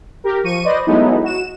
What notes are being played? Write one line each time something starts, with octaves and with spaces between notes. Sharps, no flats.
G4 A#4
F3 C#6 D#7
B4 C5 D5 D#5
F#3 G#3 A3 B3 D#4 E4
F#4 E7